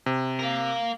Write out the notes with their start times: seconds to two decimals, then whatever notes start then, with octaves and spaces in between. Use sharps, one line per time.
0.06 C3
0.39 A#4 F5